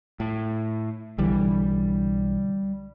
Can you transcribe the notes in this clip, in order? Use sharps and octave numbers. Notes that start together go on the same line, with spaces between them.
A2
B1 D3 E3 G3